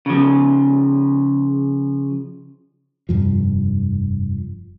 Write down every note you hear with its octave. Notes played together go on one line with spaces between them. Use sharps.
C#3 F3
F1 G2 F3